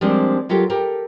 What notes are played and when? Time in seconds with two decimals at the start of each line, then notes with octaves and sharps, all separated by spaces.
0.01 F3 G3 G#3 A#3 C4 D4
0.49 F#3 F4 G4 A4 A#4
0.70 G4 A4 A#4